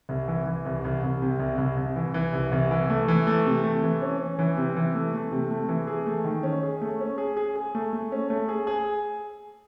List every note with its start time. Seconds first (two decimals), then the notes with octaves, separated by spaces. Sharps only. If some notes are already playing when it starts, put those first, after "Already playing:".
0.09 C2
0.28 E3
0.46 E3
0.65 C2
0.84 C2
1.03 C2
1.22 C3
1.40 C2
1.58 C2
1.77 C2
1.96 E3
2.14 E3
2.33 C2
2.52 C2
2.71 E3
2.90 A3
3.08 E3
3.27 A3
3.45 C3
3.64 A3
3.83 E3
4.02 C#4
4.20 C#4
4.39 E3
4.57 C3
4.76 E3
4.94 A3
5.13 A3
5.32 C3
5.50 A3
5.69 E3
5.87 G#4
6.06 A3
6.25 D#3
6.43 C#4
6.63 G#4
6.81 A3
7.00 C#4
7.18 G#4
7.37 G#4
7.56 G#4
7.75 A3
7.93 A3
8.12 C#4
8.30 A3
8.49 G#4
8.67 G#4